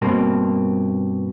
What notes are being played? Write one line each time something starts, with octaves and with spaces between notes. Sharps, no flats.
G2 B2 A#3 C4